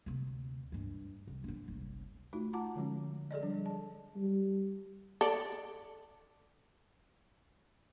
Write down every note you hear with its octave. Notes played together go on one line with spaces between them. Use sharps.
D2 C3
G2 G#3
C2
G#2 D4
G1 C2
A3 D#4 F4 F#4
F4 F#5 A5 A#5 D6
D3 F3 G#3 C#4
G#4 A4 D5 D#5
F3 G3 D4
A5
G3
A4 D5